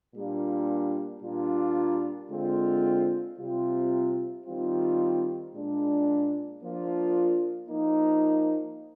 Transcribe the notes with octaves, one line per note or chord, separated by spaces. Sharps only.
A#2 G3 A#3 D4 F4
A#2 G3 A#3 D4 F4
D3 G#3 C4 F4
C3 G3 C4 F4
D#3 G3 C4 F4
A#2 G#3 D4
F3 A#3 D4 F4
F3 A#3 D#4